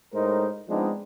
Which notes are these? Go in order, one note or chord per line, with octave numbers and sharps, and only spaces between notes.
A2 G#3 D#4 A#4 C5
F3 G#3 B3 C4 D4 D#4